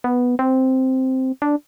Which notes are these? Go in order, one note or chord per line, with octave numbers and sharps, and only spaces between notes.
B3
C4
D4